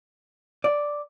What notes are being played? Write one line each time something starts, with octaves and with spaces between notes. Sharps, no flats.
D5